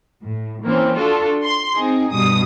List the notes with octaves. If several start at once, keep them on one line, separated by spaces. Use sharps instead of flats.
A2
E3 A#3 C4 C#4
D4 F4 F#4 A4
C6
C4 D#4 G#4
G2 B2 D#6